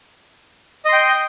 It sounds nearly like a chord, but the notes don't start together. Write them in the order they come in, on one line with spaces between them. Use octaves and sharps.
D#5 C6 G5